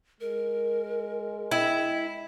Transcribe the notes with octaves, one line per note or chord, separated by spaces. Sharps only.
G#3 A#4
E4 D#5 G5 G#6